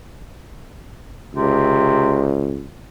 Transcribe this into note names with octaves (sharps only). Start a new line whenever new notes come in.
C#2 C3